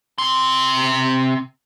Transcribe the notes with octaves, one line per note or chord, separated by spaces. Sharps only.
C3 C6